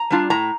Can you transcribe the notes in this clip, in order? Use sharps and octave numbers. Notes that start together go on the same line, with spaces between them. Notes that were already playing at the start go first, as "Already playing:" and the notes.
Already playing: A#5
G3 D4 F4
A2 A#5